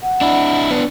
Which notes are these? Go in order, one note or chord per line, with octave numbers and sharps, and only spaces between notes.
F#5
D4 E4
B3 D4